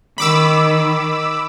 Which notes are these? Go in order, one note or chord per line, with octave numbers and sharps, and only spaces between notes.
D#3 B5 D6 E6